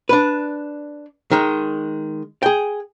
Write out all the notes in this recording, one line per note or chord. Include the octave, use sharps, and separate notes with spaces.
D4 B4
D#3 G#3
G#4 G5